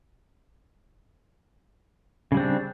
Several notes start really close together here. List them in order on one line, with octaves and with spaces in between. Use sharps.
C#3 G3 C4 D4